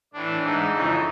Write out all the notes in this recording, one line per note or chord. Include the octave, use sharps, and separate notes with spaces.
A2 E3 D4
G#2 E3 D#4
F2 C#3 E3